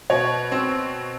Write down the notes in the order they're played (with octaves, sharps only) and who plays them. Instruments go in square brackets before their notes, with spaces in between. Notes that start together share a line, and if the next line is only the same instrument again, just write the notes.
[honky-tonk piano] B2 [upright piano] C#5
[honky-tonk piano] C4